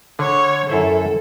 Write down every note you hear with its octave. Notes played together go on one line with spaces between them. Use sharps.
D3 C#5
F#2 E4 A4 C5